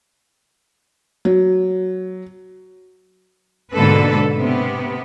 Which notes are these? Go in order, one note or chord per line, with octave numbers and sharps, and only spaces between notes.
F#3
G#2 B2 D3 A#3 A4 B4
C3 B3